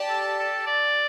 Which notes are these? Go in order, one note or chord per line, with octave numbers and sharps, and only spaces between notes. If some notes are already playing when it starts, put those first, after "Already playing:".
Already playing: G4 D5 A5
A4
A4
D5